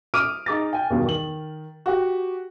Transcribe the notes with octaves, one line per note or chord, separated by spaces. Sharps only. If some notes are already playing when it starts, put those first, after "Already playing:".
D6 D#6 F6 D7 D#7
D#4 G#4 D6 A6
G5 G#5
E2 G2 B2 D#3
D#3 F#7
F#4 G4 F#5